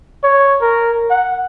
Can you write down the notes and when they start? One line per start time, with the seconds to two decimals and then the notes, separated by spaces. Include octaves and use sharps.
0.24 C#5
0.62 A#4
1.10 F#5